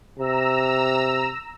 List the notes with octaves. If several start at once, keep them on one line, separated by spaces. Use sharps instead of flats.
C3 A#5 E6